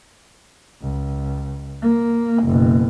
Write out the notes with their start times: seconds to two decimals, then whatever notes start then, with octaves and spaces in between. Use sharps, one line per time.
0.82 C#2
1.83 A#3
2.44 F#1 B2